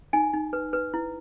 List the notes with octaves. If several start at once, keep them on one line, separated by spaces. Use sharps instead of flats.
D#4 G#5
D#4
B4
B4
E4